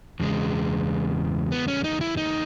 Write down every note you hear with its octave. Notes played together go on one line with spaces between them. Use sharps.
E2 C#3 G#3
B3
C#4
D#4
E4
D#4